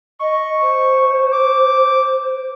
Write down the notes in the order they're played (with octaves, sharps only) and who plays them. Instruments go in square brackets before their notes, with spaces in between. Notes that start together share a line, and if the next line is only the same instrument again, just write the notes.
[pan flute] D#5 [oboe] C#6
[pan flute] C5
[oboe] D6